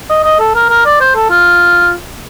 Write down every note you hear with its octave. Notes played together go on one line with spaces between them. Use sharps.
D#5
D#5
A4
A#4
A#4
D5
C5
A4
F4